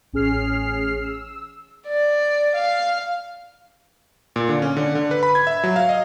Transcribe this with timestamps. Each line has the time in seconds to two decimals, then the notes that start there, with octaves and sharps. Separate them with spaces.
0.13 A1 C#4 G#4 F6 C7
1.02 E6
1.87 D5
2.55 F5
4.36 A#2
4.49 D3
4.62 C#4
4.77 D3
4.95 D3
5.11 B4
5.23 B5
5.35 G#6
5.47 E5
5.64 F#3
5.76 F5
5.89 D#5